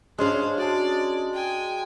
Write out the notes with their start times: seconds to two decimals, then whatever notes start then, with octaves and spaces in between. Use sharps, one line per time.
0.18 G#3 C#4 D4 G#4 C5 F5
0.58 F#4 D5 A5
1.33 G5 G#5